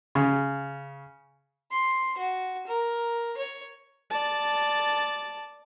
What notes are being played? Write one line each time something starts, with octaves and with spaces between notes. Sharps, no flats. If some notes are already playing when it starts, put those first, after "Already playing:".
C#3
C6
F#4
A#4
C#5
D5 A5